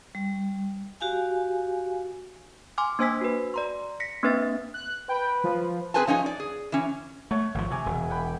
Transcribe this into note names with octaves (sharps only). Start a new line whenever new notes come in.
G3
F#4 G4 F5 G#5
G#5 C6 D6 F6
A#3 D4 C5 G#5 E6 B6
F#4 B4
D5 A#5 C6
A#6 B6 C#7
A#3 C4 D4 B4 E5 A6
F#6
B4 G5
F3
C4 G#4 B4 C5 G#5 A5
F3 C#4 D#4 G#5
D5
G#4
E3 C#4
A3 C#5 F#5
G#1 F3
C3 F#5 G#5 D6
E1
F#5 G5 B5